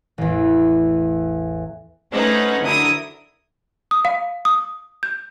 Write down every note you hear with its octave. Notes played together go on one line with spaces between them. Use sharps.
A1 E2
A3 C#4 D#4 B4 C5 F#5
D3 F#3 E4 A#4 D#6
D#6
F5
D#6
G6